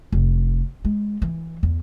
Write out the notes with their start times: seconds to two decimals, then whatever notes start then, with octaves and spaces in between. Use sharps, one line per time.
0.12 F1
0.85 G#3
1.22 E3
1.63 E2